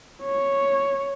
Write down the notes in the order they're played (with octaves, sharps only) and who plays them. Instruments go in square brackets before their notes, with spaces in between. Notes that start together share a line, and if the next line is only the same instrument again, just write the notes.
[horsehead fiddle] C#5